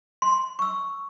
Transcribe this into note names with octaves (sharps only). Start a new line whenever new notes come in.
C6
C#6 E6